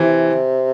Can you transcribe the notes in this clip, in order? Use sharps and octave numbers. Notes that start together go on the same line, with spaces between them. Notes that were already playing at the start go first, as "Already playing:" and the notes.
Already playing: C3 E3